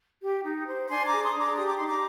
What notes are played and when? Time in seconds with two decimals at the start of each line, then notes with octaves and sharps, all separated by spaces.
0.22 G4
0.45 D#4
0.68 C5
0.89 D4 G#5 C6
1.06 A#5 D6
1.12 G#4
1.23 C6 D#6
1.34 D4
1.40 A#5 D6
1.55 G4 D#6
1.67 D6
1.77 D#4 C6
1.87 A#5 D6